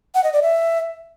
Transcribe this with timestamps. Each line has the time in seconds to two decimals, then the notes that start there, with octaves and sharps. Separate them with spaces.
0.15 F#5
0.24 D#5
0.33 D5
0.42 E5